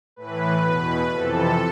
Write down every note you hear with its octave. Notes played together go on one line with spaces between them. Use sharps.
A2 E3 B4
E2 B2
F2 C3 E3 A4